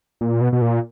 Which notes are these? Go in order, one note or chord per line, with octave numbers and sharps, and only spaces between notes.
A#2
B2
B2
A#2